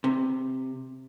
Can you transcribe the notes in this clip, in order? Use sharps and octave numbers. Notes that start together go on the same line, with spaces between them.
C3